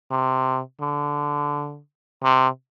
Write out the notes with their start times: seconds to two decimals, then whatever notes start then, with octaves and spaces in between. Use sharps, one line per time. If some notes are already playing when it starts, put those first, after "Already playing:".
0.11 C3
0.81 D3
2.23 C3